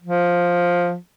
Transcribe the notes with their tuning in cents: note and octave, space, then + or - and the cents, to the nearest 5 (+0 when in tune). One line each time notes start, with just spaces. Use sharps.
F3 +5